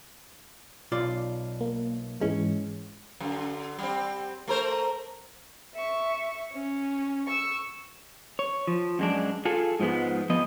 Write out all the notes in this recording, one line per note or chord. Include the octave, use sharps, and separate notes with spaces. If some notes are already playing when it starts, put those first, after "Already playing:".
B1 F4 D5
A#3
G#2 E3 G#3 C#4
F#2 D3
G3 C4
A3 A#4 C5
E5 C#6
C#4
C#6 E6
C#5
F3
F#2 G#3 D4
F4 G#4 A4
G#2 F3 G#3 B3
F3 B3 D#5